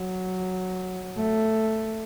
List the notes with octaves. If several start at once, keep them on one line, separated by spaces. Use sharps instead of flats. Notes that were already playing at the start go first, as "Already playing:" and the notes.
Already playing: F#3
A3